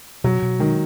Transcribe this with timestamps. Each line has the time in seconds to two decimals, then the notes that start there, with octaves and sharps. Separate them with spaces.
0.24 B2 F#3
0.42 B2
0.59 D#3 G#3